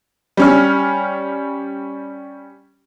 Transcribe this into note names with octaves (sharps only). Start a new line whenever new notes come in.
G3 C#4 F6